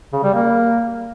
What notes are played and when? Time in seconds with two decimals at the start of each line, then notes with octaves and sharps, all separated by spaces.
0.13 C#3
0.23 G3
0.34 A#3